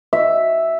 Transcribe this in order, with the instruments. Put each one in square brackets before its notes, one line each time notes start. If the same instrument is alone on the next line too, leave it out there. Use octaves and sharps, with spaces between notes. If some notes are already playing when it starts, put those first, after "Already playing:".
[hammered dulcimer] E5